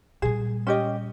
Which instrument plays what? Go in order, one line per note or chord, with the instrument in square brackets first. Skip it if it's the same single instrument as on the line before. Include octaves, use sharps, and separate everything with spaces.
[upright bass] A#2 G3 [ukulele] G#4
[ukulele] C#4 G4 D#5